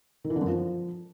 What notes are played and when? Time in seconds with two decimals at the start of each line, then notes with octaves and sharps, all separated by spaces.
0.24 D#3
0.30 E3
0.36 D3
0.41 F#2
0.47 F3